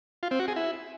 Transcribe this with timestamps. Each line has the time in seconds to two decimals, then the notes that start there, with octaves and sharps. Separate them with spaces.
0.23 F4
0.31 C4
0.40 F#4
0.48 G#4
0.56 E4